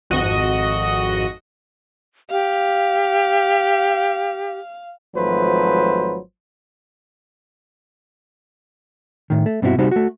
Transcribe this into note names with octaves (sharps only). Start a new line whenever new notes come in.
G#1 F2 F#4 D#5 D#6
G4 F5
G#1 F3 F#3 A3 B4 C5
A2 D#3
A3
G2 B2 C4 D4 E4 F#4
C3 G3 D#4 F#4 C5
A3 F#4